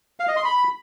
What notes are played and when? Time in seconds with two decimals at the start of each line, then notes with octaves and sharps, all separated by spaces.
0.20 F5
0.28 D#5
0.36 C6
0.45 B5